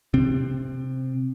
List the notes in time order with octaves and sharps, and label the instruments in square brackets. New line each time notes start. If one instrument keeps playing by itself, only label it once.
[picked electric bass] C3 C4